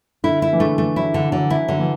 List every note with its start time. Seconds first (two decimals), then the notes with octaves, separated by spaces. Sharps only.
0.24 D3 E4
0.42 E4
0.53 E3
0.60 D3 A3
0.78 E3 A3
0.96 F#3 E4
1.14 D3
1.32 D3 F#3
1.50 E4
1.68 D3 F#3
1.79 E3